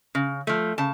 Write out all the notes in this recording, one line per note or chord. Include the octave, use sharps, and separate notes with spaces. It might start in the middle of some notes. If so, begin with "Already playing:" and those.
C#3
F3 A3
C#3 A5